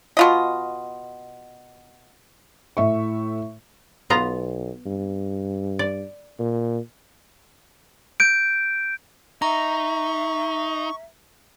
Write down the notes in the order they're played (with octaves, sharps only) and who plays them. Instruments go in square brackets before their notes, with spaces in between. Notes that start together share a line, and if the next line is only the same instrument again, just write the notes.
[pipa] B2 F4 D#5
[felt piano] A2 E5 C#6
[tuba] B1 [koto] B3 F4 A#5
[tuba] G2
[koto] D5
[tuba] A#2
[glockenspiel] G6 D7
[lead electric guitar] D#4 [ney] E5 [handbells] A#5 [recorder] C#6